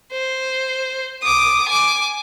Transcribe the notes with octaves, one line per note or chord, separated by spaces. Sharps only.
C5
D6 D#6
G#5 D6